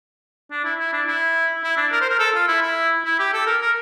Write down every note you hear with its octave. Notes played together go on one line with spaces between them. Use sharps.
D4
E4
E4
D4
E4
E4
D4
A#4
C5
A#4
A4
F4
E4
E4
E4
G4
A4
A#4
A#4